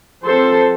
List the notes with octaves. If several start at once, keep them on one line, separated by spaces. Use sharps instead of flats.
F3 C4 A4 C5